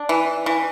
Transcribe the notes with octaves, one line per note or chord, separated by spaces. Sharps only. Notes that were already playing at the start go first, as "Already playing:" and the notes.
Already playing: D4
E3
E3